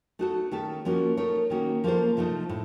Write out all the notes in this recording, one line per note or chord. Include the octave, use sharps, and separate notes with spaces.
A3 D#4 F#4 A4
D#3 A3 C#4 A4
F3 A#3 C#4 F#4
A3 D#4 A#4 C#5
D#3 A#3 C#4 F#4
F3 A#3 C#4 A4 C5
C3 F3 A3 D#4
A2